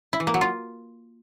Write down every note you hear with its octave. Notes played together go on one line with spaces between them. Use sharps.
E4
E3
A#3
F#3
F4